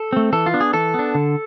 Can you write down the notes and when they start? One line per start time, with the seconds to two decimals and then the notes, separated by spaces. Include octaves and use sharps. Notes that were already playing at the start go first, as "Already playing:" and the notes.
Already playing: A4
0.13 A3 C4
0.33 E3 A4
0.46 F4
0.54 B3 D4
0.60 G#4
0.73 E3 A4
0.94 B3 D4
1.15 D3